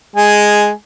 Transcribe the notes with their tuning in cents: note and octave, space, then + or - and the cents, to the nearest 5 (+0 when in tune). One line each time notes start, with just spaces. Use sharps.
G#3 +0 G#5 +0